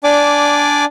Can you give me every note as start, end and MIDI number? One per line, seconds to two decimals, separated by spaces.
0.04 0.85 62
0.04 0.85 74
0.04 0.85 80
0.04 0.85 86